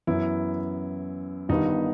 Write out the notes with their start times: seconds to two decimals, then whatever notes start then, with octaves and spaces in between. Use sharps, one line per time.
0.07 F#2 E3 B3 E4
1.49 G1 G2 D#3 G3 B3 D#4